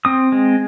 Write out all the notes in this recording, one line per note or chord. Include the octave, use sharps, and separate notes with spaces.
C4 D#6
G#3